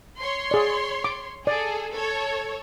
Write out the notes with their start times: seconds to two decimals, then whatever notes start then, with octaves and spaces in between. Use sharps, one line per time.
0.19 C#5 C6
0.51 G#4 D5
1.04 D6
1.47 G#4 A4 D5
1.92 A4 C#5